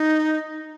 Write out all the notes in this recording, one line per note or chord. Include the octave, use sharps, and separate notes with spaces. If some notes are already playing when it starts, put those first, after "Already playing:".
Already playing: D#4